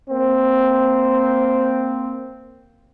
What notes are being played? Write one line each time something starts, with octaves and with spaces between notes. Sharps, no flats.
A#3 C4